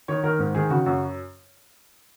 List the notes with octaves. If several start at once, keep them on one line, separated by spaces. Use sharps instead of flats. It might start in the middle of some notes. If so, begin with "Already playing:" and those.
D#3 C#5
D#3 A#4
G#2
D#3 G#4
C#3 F#4
F#2 F#4